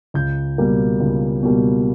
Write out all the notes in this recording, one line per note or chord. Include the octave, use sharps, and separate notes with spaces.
C#2 G6
B2 G3 A#3
C#2
B2 G3 A#3